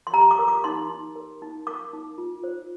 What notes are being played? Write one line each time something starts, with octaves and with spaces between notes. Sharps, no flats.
C6
G4 A#5
D6
A#4
D6
D#4 C6
D#4
A#4
D#4
A#4 D6
D#4
F4
C5